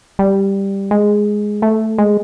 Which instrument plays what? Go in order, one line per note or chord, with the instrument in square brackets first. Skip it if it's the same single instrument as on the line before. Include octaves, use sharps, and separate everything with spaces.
[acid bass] G3
G#3
A3
G#3